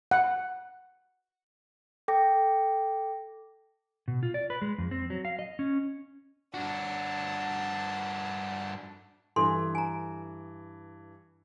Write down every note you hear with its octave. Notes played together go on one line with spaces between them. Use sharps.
F#5
A4 G5 D6 A#6
B2
F4
D5
B4
G#3
F2
C4
F#3
F5
D#5
C#4
G2 D4 F#4 A5
G2 E3 D4 A4 C6
G#5 A#5